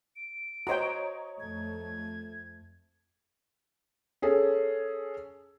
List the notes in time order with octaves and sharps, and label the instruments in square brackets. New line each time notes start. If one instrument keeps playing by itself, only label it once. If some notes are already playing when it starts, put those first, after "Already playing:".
[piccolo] D7
[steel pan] F#4 C5 G5 [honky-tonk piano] C#5 D#5 A#5
[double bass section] F2 A3 [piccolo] G#6
[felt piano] C#4 G#4 A4